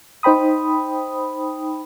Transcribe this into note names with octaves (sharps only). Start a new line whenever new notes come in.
D#4 C5 G5 B5 D#6